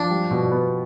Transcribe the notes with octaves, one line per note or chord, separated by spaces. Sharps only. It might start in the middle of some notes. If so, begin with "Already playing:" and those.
Already playing: F3 D4
G3
B2
B3